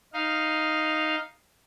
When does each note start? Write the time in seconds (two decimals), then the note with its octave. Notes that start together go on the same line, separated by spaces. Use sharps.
0.13 D#4 F5